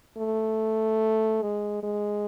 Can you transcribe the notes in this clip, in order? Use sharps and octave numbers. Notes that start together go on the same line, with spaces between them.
A3
G#3
G#3